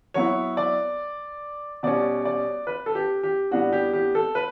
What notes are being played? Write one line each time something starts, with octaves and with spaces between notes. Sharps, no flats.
F#3 B3 E4 C#5
D5
B2 G3 C#4 D5
D5
B4
A4
G4
G4
A2 G3 B3 D4 F#4
G4
G4
A4
B4